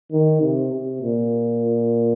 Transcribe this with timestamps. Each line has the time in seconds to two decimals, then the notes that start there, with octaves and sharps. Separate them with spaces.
0.12 D#3
0.42 C3
0.72 C3
1.02 A#2